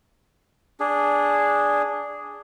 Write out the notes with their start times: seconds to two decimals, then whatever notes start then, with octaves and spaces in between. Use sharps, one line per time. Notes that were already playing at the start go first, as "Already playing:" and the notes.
0.80 D4 G#4